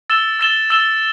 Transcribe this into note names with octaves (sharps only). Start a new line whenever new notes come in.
E6 A6 E7 G7
E6 A6 E7 G7
E6 A6 E7 G7